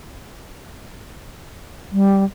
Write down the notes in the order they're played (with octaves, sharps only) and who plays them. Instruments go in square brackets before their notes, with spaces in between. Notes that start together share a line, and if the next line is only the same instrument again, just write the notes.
[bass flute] G3